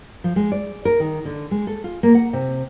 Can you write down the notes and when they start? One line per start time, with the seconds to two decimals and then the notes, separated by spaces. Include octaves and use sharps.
0.24 F3
0.36 G#3
0.52 D5
0.85 A#4
1.00 D#3
1.25 D3
1.51 G#3
1.67 A4
1.84 F4
2.03 A#3
2.14 F#5
2.33 C3